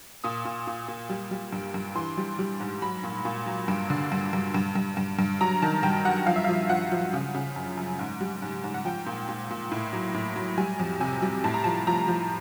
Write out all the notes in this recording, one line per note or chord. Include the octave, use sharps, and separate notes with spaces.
A#2 D#6
A#2
A#2
A#2
G3
G3
G2
G2
E3 C6
G3
G3
G#2
F#3 B5
A#2
A#2
F#3
G2
D3
G2
G2
G2
G2
G2
G2
F#3 A#5
D#3 A5
G2 G5
F#3 F#5
F3 F5
E5
F3 F5
F3 F#5
F3
C#3
C#3
F#2
F#2
G#2
G3
G#2
G#2
F#5
F3 G5
A#2
A#2
A#2
A2
F#3
A2
F#3
G3 G#5
F2
C3 G#5
G3
A2 A5
A#5
F3 A5
F3 A#5
F3